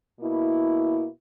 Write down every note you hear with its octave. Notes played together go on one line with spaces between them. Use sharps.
B2 A#3 E4